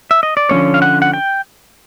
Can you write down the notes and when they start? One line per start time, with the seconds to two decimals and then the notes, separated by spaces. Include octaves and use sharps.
0.11 E5
0.23 D#5
0.37 D5
0.49 D3 F3 A3 C#4 C#5
0.74 F5
0.82 F#5
1.02 F#5
1.14 G5